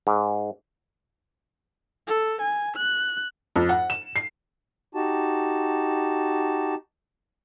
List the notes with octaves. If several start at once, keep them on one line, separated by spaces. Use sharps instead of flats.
G#2
A4
G#5
F#6
F2
F#5
E7
C7
D#4 F#4 G4 A5